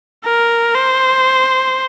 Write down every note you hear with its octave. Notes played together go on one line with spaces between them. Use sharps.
A#4
C5